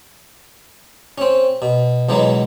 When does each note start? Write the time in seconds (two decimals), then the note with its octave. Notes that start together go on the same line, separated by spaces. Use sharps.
1.18 C4 C#4
1.62 B2
2.09 C#2 B2 E3 F#3 G#3